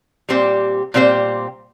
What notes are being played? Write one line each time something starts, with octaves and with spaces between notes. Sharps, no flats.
A#2 G3 C4 G4 C5
A#2 G3 C4 G4 C5